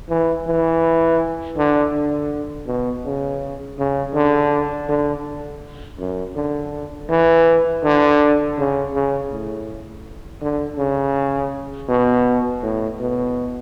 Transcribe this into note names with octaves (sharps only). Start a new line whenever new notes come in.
E3
E3
D3
D3
B2
C#3
C#3
D3
D3
F#2
D3
E3
D3
C#3
C#3
A2
D3
C#3
B2
A2
B2